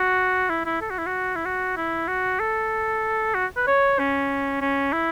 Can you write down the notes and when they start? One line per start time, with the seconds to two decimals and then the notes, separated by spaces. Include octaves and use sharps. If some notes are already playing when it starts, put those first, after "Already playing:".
Already playing: F#4
0.50 E4
0.66 E4
0.81 A4
0.90 F#4
0.98 E4
1.06 F#4
1.35 E4
1.45 F#4
1.77 E4
2.08 F#4
2.40 A4
3.34 F#4
3.57 B4
3.67 C#5
3.99 C#4
4.61 C#4
4.93 E4